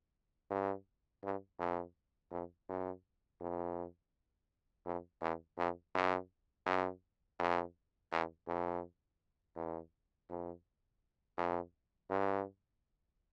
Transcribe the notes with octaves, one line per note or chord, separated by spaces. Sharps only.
G2
G2
F2
F2
F#2
F2
F2
E2
F2
F#2
F#2
F2
E2
F2
E2
F2
F2
G2